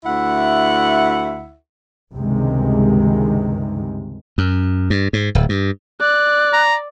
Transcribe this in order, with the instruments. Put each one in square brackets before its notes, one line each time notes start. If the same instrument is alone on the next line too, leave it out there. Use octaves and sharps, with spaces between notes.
[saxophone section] D2 E4 E5 F#5
[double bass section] C#2 G2 C3 D#3 G#3
[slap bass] F#2
G2
G#2
D1
G2
[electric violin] D5 [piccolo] F#6
[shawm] A#5